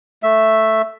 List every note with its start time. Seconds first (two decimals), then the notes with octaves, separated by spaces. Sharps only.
0.23 A3 E5